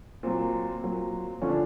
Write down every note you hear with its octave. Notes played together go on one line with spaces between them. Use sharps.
A#2 F#3 C4
A#2 F#3
D3 F3 C#4
D4